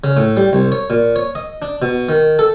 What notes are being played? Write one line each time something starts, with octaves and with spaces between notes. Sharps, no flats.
C#3
A2
G3
C2
C#5
A#2
C#5
D#5
D4
B2
D#3
A4